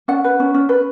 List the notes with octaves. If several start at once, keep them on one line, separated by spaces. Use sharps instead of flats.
C#4 F#5
B4
C#4
C#4
B4